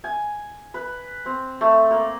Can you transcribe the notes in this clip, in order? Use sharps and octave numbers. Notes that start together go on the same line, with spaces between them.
G#5
B4
C4
A3
A#3